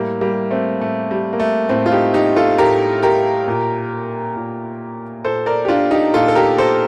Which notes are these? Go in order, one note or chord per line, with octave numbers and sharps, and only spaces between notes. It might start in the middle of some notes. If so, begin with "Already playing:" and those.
Already playing: A2 G3 A#3
G3 A#3
A3 C4
A2 A3
G3
A#3
A3
A2 A3 C4
F4
D#4 G4
D#4 G4
F4 A4
A2 G4 A#4
G4 A#4
A#2
A#2
A#2 A4 C5
A#4 D5
G4
D4 F4
D#4 G4
A#2 F4 A4
A4
G4 A#4
A4 C5